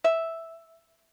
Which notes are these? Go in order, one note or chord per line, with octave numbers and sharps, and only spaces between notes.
E5